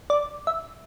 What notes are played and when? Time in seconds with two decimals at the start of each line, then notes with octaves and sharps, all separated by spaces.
0.10 D5
0.47 E5